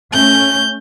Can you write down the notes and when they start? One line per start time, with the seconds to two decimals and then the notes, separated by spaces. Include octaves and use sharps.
0.12 A3 C#4 G6